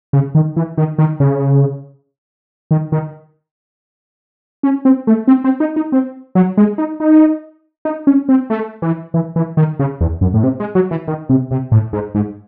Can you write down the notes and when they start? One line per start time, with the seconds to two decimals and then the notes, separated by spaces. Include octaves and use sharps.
0.13 C#3
0.35 D#3
0.56 E3
0.77 D#3
0.98 D#3
1.20 C#3
2.71 D#3
2.92 D#3
4.63 C#4
4.85 C4
5.07 A3
5.28 C4
5.44 C4
5.60 D#4
5.76 D#4
5.92 C4
6.35 F#3
6.57 G#3
6.78 D#4
7.00 D#4
7.85 D#4
8.07 C#4
8.29 C4
8.50 A3
8.82 E3
9.14 E3
9.36 E3
9.57 D#3
9.79 C#3
10.01 E2
10.21 F#2
10.34 A2
10.43 C3
10.60 G#3
10.75 F#3
10.91 E3
11.08 D#3
11.29 C3
11.51 C3
11.72 A2
11.93 G#2
12.15 G#2